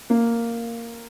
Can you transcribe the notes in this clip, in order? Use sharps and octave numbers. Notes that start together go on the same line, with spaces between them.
A#3